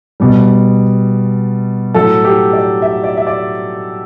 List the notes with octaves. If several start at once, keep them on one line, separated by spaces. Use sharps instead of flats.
B2 G3
A2 F#3 A4
G4
D5
E5
D5
E5
D5